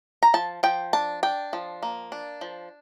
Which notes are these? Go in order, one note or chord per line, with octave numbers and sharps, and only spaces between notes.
A#5
F3 A5
F3 G5
D4 A5
D4 G5
F3
A#3
D4
F3